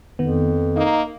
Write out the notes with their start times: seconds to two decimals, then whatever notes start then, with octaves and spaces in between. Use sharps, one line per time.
0.19 F2 D#3 B3
0.76 A#3 D#4